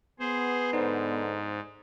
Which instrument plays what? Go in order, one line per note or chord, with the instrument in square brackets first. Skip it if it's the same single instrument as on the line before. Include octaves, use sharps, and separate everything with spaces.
[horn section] B3 [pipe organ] G#4 C5
[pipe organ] G#2 [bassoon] D3 [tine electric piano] D#4 C5